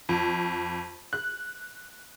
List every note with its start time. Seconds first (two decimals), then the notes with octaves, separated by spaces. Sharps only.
0.09 F2
1.13 F#6